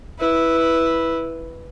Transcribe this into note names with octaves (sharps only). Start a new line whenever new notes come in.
E4 B4